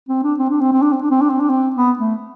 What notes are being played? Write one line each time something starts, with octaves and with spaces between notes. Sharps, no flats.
C4
D4
C4
D4
C4
C4
D4
C4
D4
C4
D4
C4
D4
C4
B3
A3